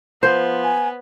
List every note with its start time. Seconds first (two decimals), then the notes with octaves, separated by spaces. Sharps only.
0.23 F3 B3 C5
0.64 G#5